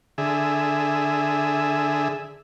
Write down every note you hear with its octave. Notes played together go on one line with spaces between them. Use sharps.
D3 G#4 E5